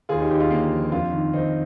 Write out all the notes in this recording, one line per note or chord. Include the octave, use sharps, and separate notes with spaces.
D#2 F4 G#4
D#4 G4
D#2 D#4 G4
F4 G#4
D3 A#3 D4
F3
F2 D4 F4
D#3
D#3 C4 D#4